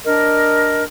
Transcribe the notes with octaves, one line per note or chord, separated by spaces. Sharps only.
D4 A#4 D#5